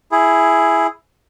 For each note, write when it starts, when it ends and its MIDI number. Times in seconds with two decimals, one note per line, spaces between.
0.12 0.87 64
0.12 0.87 68